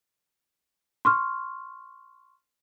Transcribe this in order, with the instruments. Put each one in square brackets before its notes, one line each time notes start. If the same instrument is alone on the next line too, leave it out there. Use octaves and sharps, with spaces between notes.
[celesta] C6 C#6 F6